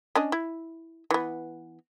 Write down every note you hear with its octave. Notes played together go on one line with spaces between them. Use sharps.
C#4 D4 D#5
E4
E3 B3